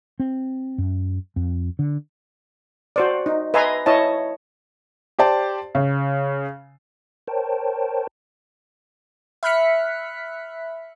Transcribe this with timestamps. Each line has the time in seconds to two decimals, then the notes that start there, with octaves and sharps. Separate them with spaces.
0.20 C4
0.78 F#2
1.36 F2
1.79 D3
2.96 F#4 C5 D5
3.26 D#4
3.54 B4 D#5 E5 G#5 A#5 C6
3.86 E4 C#5 D#5 A5
5.19 G4 C5 D5 A5
5.75 C#3
7.28 A#4 C5 C#5 G5 A5
9.43 E5 B5 F6 F#6 B6 C#7